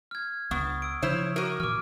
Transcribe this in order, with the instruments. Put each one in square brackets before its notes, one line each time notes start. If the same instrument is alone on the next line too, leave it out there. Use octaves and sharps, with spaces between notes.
[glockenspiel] F6 G#6
[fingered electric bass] C#2 [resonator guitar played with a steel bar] B3 [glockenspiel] C#6 D#6
[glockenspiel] E6 D7
[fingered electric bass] C#3 F3 [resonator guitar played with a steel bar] E4 C5 C#5
[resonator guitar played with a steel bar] F#4 A#4 [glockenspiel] D7 D#7
[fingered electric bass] A#2 E3 [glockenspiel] D6 F6